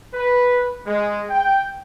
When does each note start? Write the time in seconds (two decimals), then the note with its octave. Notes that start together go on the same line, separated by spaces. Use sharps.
0.12 B4
0.86 G#3
1.30 G5